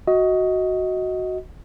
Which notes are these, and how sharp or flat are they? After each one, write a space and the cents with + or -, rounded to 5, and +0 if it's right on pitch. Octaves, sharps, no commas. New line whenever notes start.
F#4 +0 D#5 +20